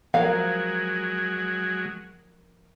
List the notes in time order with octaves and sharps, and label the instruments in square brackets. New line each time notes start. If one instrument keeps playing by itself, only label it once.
[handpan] F3 A#4 [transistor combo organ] F#3 G#3 [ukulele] F5